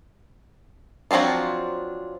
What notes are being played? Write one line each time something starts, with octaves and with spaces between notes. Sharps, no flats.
F3 F#3 C4 D4 F4